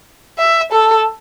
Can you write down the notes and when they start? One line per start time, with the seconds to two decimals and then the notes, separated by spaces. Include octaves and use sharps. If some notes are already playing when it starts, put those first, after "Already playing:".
0.38 E5
0.72 A4